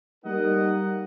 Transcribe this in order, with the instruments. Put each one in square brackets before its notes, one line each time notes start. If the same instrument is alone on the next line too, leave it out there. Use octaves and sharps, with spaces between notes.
[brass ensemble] G3 A#3 D#4 A#4 D#5 F#5